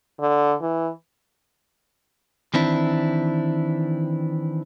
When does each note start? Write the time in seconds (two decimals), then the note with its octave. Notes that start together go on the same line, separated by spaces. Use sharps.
0.20 D3
0.61 E3
2.54 D#3 E3 C4 D4 E4